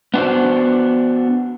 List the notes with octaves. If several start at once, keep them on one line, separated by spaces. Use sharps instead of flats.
B3 D4 F#4 C5